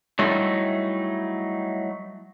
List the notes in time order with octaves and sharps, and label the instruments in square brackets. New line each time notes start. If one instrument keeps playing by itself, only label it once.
[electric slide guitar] F#3 G3 A3 D#4 E4